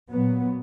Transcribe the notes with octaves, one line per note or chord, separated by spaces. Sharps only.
A#2 F#3 B3